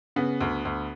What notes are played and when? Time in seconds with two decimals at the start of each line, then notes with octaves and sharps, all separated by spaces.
0.16 C#3 B3
0.41 D2
0.65 D2